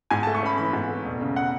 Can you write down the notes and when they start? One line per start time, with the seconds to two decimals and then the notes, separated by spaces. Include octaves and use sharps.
0.10 G#2 G#5
0.23 A5
0.27 A3
0.35 C#6
0.43 C#4 B5
0.58 E3 B5
0.73 G#2
0.89 A3
1.05 E1
1.21 C#3
1.36 F#5